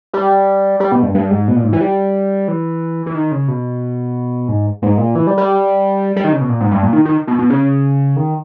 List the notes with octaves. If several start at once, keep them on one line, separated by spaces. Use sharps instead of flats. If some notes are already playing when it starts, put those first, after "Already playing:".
G3
G3
B2
G2
G2
G#2
B2
A#2
G#2
E3
G3
E3
E3
D#3
C#3
B2
G#2
G#2
A#2
E3
G3
G3
G3
D#3
C#3
B2
A#2
G#2
G2
A#2
D#3
D#3
B2
B2
C#3
D#3